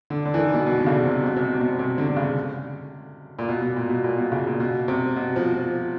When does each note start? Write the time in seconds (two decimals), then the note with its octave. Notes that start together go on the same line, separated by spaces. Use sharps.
0.10 D3
0.25 D3
0.34 E3
0.39 D#3
0.54 B2
0.67 B2
0.81 D3
0.86 C#3
1.05 C3
1.23 B2
1.37 C3
1.42 B2
1.55 C3
1.60 B2
1.79 C3
1.98 D3
2.08 D3
2.17 C#3
3.39 A#2
3.49 B2
3.62 B2
3.76 A#2
3.90 B2
4.04 A#2
4.18 B2
4.32 C#3
4.47 A#2
4.60 B2
4.88 C3
5.16 B2
5.36 F3
5.54 F3